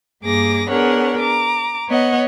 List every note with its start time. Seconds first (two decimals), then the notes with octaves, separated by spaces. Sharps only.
0.22 G2 A#3 G#4 D6 A#6
0.69 B3 D4 G#4 A#4 C#5 F#5
1.19 A#5 D6
1.88 B3 C#5 D#5 F#5